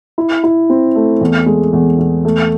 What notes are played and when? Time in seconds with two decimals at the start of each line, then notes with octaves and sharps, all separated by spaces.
0.18 E4
0.44 E4
0.70 C4
0.95 A3
1.21 E2
1.46 G#3
1.73 E2
1.99 E2
2.25 A3